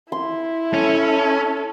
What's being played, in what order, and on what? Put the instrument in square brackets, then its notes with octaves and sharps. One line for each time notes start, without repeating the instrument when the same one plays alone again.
[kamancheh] E4 [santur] C6
[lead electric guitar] C#4 [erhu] A4